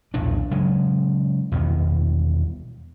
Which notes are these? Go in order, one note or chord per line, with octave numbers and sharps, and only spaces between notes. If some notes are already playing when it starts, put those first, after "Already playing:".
B1 E2 A#2 D4
C#3 F#3 G#3
E2 B2 D#3